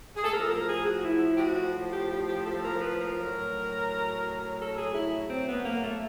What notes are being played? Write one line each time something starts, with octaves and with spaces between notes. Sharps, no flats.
G#4
A4
A2 F3 A#4
A#4
G#4
F#4
E4
G4
F#4
G4
G4
G4
A4
A#4
B4
A#4
A2 F#3
A4
G#4
E4
C4
B3
A#3
A3